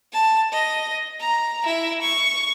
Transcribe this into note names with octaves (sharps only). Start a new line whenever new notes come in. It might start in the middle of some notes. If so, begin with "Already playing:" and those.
A5
D#5
A#5
E4 E5
C#6